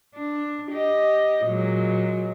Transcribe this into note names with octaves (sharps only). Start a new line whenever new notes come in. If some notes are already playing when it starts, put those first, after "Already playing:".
D4
G4 D#5
A#2 F#3 G#3